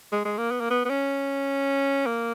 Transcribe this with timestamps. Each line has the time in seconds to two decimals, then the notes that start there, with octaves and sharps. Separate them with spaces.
0.12 G#3
0.25 G#3
0.38 A#3
0.51 B3
0.60 A#3
0.71 B3
0.85 B3
0.90 C#4
2.06 A#3